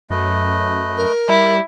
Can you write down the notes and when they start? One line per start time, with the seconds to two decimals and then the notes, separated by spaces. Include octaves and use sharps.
0.10 F#2 A3 B4 D#5
0.97 A#4
1.29 G3 E4